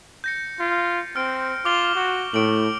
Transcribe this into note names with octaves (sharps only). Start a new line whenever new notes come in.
G6 A#6 C#7
F4
C4 F6 D7
F4 D6 F7 G7
F#4
A2 A3 D7 F#7